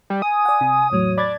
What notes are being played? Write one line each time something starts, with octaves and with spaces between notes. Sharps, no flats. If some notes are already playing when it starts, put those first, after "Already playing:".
G3
G#5 D#6
D5 F#5
C3
E2 A2 F#3 C#5
D4 B5 G#6 A6